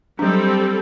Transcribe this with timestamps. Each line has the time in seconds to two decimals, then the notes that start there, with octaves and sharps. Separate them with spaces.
0.19 F#3 G3 C4 D4 A4